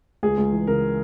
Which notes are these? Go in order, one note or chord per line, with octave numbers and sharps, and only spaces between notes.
C#2 G#4
C#2
E3
C#3 A#4